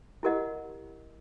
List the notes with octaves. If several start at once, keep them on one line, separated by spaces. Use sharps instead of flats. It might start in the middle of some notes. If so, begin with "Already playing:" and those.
E4 G4 A#4 D#5 F#5